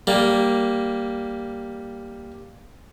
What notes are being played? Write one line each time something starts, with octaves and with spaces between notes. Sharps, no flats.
G3 A#3